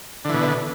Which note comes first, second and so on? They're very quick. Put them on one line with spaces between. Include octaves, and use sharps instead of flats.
D3 E3 B2